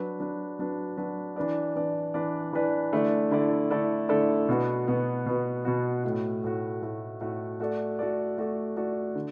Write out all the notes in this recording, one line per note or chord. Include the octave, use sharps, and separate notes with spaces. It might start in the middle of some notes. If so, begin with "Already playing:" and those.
Already playing: F#3 D4 B4
F#3 D4 B4
F#3 D4 B4
F#3 D4 B4
E3 D4 B4 D5
E3 D4 B4 D5
E3 D4 B4 D5
E3 D4 B4 D5
D3 A3 E4 A4 D5
D3 A3 E4 A4 D5
D3 A3 E4 A4 D5
D3 A3 E4 A4 D5
B2 B3 F#4
B2 B3 F#4
B2 B3 F#4
B2 B3 F#4
A2 A3 F#4
A2 A3 F#4
A2 A3 F#4
A2 A3 F#4
A3 F#4 A4 D5
A3 F#4 A4 D5
A3 F#4 A4 D5
A3 F#4 A4 D5
D3